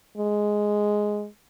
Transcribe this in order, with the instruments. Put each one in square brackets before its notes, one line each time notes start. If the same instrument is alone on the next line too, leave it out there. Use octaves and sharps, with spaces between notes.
[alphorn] G#3